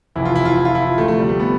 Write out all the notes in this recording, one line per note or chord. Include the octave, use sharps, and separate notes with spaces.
F1 F2 E3 E4
F4
E4
F4
E4
F4
E4
D2 C3 F3 A3
A3
G3
A3
B3